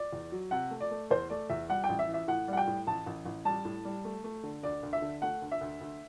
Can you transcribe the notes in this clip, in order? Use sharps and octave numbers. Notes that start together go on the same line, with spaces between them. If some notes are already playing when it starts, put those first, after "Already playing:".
Already playing: D5
E2
F#3
C3 F#5
A3
D5
A3
E2 C5
A3 D5
E2 E5
G3 F#5
G5
A1
E5
E3
E5
A2 F#5
G3 F#5
G5
A2
A1 A5
A1
A1
G3 A5
A2
G3
A3
A3
D3
D2 D5
D2
E5
D3
A3 F#5
D2
E5
D2
D2